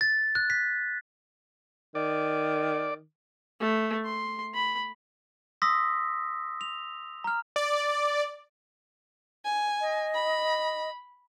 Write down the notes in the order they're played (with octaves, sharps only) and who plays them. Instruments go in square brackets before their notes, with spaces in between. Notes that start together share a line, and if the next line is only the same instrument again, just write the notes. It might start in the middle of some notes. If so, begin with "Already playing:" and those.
[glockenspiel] A6
F#6
B6
[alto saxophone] D#3 [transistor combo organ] D5
[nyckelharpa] A3
C6
B5
[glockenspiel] C6 D#6 E6 A#6 B6
F7
A#5 F6
[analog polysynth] D5
[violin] G#5
[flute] D#5
[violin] B5